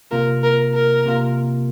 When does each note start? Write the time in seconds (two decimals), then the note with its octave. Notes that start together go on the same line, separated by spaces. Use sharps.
0.12 C3 A#3 F4 A#4
0.43 A#4
0.75 A#4
1.06 C3 A#3 F4